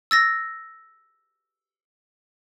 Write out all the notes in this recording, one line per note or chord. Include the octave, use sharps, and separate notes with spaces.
E6 A6 A#6